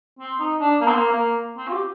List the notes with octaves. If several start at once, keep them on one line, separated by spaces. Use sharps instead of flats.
C4
D#4
D4
A#3
C4
A#3
A#3
C4
F4
G4